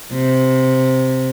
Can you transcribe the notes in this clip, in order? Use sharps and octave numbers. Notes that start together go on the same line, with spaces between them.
C3